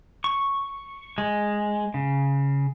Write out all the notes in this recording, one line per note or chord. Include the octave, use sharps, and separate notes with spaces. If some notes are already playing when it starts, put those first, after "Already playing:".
C#6
G#3
C#3